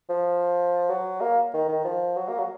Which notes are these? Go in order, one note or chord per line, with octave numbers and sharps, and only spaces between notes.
F3
F#3
A#3
D#3
D#3
F3
F#3
A#3
F#3